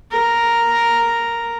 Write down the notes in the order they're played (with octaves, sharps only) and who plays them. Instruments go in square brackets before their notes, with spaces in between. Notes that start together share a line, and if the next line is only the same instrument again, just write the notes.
[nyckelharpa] A#4